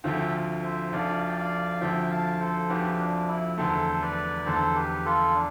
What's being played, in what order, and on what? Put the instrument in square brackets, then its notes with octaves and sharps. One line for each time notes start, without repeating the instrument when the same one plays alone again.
[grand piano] D2 D3 F3 C4 F4 [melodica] E5 G5
[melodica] C5 E5
[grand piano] D2 D3 F3 C4 F4 [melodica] D5 F5
[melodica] G5
D5 F5
[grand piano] D2 D3 F3 C4 F4 [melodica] E5 G5
[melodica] F5 A5
A4 C5
[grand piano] D2 D3 F3 C4 F4 [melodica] G4 B4
[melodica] D4
E4
[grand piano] E2 D3 A3 [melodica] A4 C5
[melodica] B4 D5
[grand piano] E2 D3 A3 [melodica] A4 C5
[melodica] G4 B4
F4 A4
D4